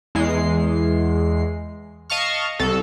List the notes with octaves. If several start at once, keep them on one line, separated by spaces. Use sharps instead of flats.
E2 G#3 C7
D#5 F5 A5 C#6 F6
C2 A4